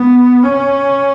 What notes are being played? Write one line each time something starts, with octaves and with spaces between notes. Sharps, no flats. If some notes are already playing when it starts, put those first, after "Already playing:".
Already playing: B3
C#4